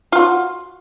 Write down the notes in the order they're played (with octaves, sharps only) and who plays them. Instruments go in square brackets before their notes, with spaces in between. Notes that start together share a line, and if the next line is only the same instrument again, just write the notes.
[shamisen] F4 F#4